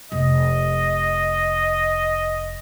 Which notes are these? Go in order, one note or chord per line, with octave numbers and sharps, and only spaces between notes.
F1 D#5